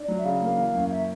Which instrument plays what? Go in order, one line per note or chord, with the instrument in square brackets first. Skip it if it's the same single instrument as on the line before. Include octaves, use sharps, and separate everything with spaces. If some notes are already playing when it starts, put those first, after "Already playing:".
Already playing: [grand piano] D4
F#3
[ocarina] E5
[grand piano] C#3 [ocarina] F5
[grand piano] A#3
E3
F#2
[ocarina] E5